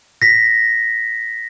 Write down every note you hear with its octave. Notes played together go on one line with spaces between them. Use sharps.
A#6 B6